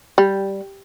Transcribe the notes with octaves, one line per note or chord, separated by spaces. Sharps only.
G3